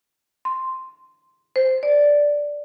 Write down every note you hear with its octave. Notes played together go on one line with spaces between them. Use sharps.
C6
C5
D5